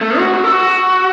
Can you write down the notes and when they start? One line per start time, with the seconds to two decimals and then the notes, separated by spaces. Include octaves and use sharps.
0.01 A3
0.18 F#4
0.34 F#4
0.44 A4
0.52 F#4